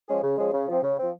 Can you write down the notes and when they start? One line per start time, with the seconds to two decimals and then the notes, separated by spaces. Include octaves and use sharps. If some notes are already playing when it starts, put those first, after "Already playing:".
0.08 F3 G#3 C#4 G#4
0.23 C#3
0.38 F3 G#3 C#4 G#4
0.53 C#3
0.68 F3 C4
0.83 C#3
0.99 F3 C4